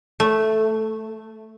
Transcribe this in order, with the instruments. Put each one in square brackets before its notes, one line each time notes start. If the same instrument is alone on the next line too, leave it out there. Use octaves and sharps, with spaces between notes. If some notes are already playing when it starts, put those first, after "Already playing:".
[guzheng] A3